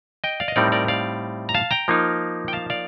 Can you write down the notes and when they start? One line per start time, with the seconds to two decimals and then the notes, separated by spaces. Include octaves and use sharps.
0.24 D#5 G5
0.40 D5 F5
0.48 D#5
0.56 A2 G3 C4 D#4 A#4 D5
0.72 A#4 D5
0.88 D5 F5
1.49 A#5
1.55 F5 A5
1.71 G5 A#5
1.88 F3 A#3 D#4
2.48 G5
2.53 F5 A5
2.70 D5 F5